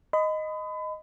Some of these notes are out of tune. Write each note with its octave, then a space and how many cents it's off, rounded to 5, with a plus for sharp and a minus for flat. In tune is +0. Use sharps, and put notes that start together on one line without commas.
D#5 +0 B5 +35